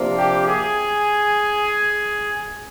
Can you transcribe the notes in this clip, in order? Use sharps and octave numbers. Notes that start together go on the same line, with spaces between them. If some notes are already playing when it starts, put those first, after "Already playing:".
Already playing: C3 F3 A#3 D4
G4
G#4